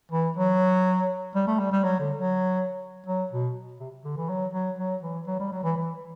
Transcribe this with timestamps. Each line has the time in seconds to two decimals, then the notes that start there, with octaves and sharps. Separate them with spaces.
0.12 E3
0.37 F#3
1.35 G3
1.48 A3
1.59 G3
1.72 G3
1.84 F#3
2.00 D3
2.17 F#3
3.06 F#3
3.31 B2
3.80 C3
4.04 D3
4.17 E3
4.29 F#3
4.54 F#3
4.79 F#3
5.03 E3
5.27 F#3
5.40 G3
5.52 F#3
5.64 E3
5.77 E3